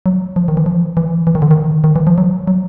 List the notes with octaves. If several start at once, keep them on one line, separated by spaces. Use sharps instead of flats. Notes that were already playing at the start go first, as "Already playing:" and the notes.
F#3
F3
D#3
E3
F3
E3
E3
D#3
D3
D#3
D#3
E3
F3
F#3
F#3